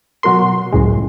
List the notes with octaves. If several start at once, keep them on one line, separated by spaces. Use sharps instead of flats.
B2 F#3 F#4 A#4 C6
C#2 F#2 A2 C#3 G#3